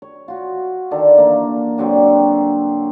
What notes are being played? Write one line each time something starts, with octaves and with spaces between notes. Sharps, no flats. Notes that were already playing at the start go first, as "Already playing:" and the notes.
C#5
F4 F#4
D3 D#3 D4 A4
E3 A#3
D3 F#3 C4 G4